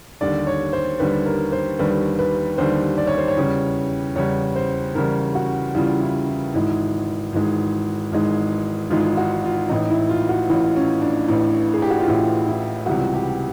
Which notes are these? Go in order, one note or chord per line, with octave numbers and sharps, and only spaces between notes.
D#2 D3 G3 D5
C#5
C5
D#2 D3 G3 B4
A#4
C5
D#2 D3 G3 B4
B4
D#2 D3 G3 C5
D5
C#5
C5
C#5
E2 C#3 E3 G3
E2 C#3 E3 G3 C#5
C5
E2 C#3 E3 G3 A#4
F#4
E2 C#3 E3 G3 F4
E4
E4
G#1 G#2 E3 G#3 E4
G#1 G#2 E3 G#3
G#1 G#2 E3 G#3
G#1 G#2 E3 G#3 F4
F#4
F4
A1 A2 E3 D#4
E4
F4
F#4
A1 A2 E3 F4
C#4
D4
A1 A2 E3
G#4
G4
F#4
F4
A1 A2 E3 E4
E4
C#2 C3 E3 G3 F#4
G4